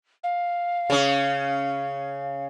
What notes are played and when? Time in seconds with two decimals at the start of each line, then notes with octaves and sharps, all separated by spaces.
0.24 F5
0.90 C#3 C#4